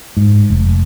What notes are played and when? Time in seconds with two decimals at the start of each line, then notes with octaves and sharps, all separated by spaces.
0.17 G#2
0.50 F1